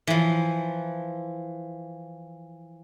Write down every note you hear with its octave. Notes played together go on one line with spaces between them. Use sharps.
E3 F3